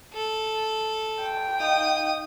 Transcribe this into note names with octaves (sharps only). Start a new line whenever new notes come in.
A4
G5
D#4 D#5 F5 D#6